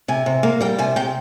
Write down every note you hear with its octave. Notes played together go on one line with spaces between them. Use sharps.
C3 G#5
C3
A#3
G3 G5
C3 G#5
C3 G5